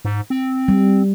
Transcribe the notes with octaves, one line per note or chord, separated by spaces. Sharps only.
G#2
C4
G3